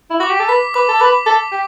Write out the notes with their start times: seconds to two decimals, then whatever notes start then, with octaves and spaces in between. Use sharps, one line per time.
0.10 E4
0.20 F#4 D6
0.30 G4
0.40 A4
0.49 B4 B6
0.74 B4 D6
0.88 A4
1.00 B4 D6
1.26 A4 D6
1.52 G4